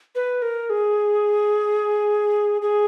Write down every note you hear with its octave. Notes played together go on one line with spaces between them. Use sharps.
B4
A#4
G#4
G#4